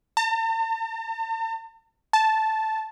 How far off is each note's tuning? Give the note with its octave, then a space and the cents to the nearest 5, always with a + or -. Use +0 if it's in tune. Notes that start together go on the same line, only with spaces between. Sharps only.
A5 +45
A5 -5